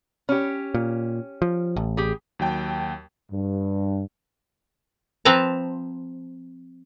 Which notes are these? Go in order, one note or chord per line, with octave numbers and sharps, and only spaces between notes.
C#4 G4
A#2
F3
A1
G4 G#4
D#2 F#3 G5 A5
G2
F3 C4 B4 A5 A#5